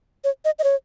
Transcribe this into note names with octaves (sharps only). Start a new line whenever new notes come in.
C#5
D#5
D#5
C#5